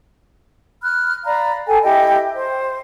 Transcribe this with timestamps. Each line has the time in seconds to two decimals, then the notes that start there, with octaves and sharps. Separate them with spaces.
0.81 B5 F6 F#6
1.24 D5 F5 A#5 B5
1.67 A4 G5 G#5
1.83 E4 G4 D#5 G5
2.34 C5